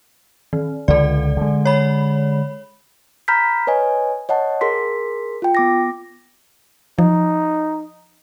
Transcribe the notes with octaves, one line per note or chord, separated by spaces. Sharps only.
D#3
C#2 D3 A4 D5
D3 G#3
C#5 B5
A#5 B5 F6 G6 B6
B4 C#5 D#5 G#5
C#5 D#5 F#5 A5
G#4 A#4 C6 B6
F4 G5
B3 D6 A#6
F3 D#4